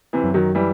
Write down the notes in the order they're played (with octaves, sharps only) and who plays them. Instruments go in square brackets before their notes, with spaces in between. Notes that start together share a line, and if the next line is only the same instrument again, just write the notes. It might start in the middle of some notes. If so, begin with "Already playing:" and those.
[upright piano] C3 E3
[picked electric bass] F#2
[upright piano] D#3 F#3
E3 G3